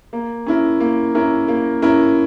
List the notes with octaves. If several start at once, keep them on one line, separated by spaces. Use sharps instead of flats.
A#3
C#4 E4 A#4
A#3
C#4 E4 A#4
A#3
C#4 E4 A#4